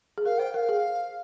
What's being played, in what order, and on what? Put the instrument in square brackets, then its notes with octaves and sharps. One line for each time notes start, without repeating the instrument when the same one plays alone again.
[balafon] G#4
[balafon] A#4 [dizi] F5
[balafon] C5 [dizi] G5
[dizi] G5
[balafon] A#4 [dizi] F5
[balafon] G#4